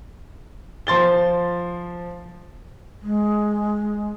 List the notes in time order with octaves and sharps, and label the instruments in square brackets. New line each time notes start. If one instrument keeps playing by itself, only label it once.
[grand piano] F3 C6 A6 G7
[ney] G#3